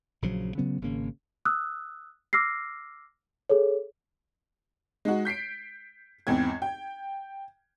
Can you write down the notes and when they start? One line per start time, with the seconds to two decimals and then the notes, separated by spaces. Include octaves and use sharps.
0.22 A#1 C#3 F3 F#3
0.58 C#3 F#3 B3 C#4
0.82 G#1 C#3 A#3 C#4
1.45 D#6 E6 F#6
2.33 D6 E6 F6 A#6 C7
3.50 G#4 A4 C#5
5.05 G#3 D#4 F#4
5.25 G6 B6 C7 D7
6.27 G#1 E2 C4 G#6
6.62 G5